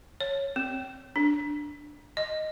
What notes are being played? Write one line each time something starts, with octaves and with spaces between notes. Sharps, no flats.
C#5
C4
D4
D#5